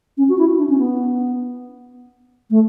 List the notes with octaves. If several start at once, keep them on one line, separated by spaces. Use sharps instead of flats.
C#4
F#4
E4
D4
C#4
B3
A3